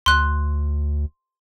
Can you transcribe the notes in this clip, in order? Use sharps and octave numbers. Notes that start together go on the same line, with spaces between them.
D2 C6 F#6